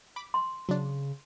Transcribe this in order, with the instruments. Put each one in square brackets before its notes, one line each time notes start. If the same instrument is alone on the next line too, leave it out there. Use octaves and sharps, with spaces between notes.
[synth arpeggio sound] B5 D6
[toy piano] C6
[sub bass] C#3 [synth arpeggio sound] F#3 D4